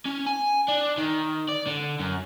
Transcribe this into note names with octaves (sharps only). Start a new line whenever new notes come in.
C#4
G#5
D4
D#3
D5
D3
F#2